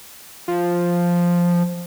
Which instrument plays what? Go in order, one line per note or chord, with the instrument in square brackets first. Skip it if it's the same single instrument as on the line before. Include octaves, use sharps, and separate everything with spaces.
[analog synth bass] F3